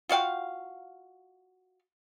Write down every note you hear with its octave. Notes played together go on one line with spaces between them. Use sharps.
F4 F#4 F5 G5